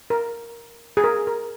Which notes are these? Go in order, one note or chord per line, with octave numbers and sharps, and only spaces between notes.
A#4
G#4
A#4
A#4